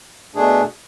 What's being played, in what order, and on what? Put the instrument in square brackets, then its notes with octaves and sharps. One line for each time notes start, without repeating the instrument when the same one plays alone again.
[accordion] B2 A3 D4 G#4